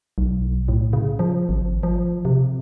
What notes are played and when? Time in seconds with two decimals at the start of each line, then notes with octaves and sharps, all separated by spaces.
0.18 B1
0.68 A2
0.93 C#3
1.19 F3
1.49 G#1
1.83 F3
2.25 C3